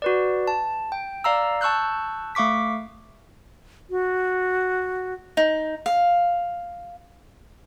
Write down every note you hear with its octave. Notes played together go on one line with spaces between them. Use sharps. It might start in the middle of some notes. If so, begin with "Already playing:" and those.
F#4 B4 D5
A5
G5
D5 F5 A#5 E6
A5 C#6 E6 F#6 G6
A3 F5 C#6 D6 B6
F#4
D#4
F5